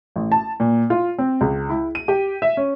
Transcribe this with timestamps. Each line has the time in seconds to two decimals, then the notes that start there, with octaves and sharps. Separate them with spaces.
0.16 A1
0.32 A5
0.60 A#2
0.90 F4
1.18 C4
1.41 C#2
1.69 E4
1.95 D#7
2.08 G4
2.42 E5
2.57 C#4